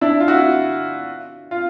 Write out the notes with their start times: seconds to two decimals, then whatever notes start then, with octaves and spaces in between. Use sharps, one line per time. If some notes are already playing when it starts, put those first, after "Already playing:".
0.01 D4 E4
0.20 F4
0.28 E4 F#4
1.51 F4